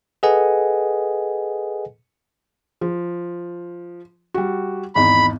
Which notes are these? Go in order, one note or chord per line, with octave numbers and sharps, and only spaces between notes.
G#4 A4 B4 D#5 F#5 G#5
F3
G3 F#4
G#1 E2 D#4 B5